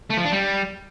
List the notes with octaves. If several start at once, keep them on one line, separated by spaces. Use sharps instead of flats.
A3
F3
D4
G3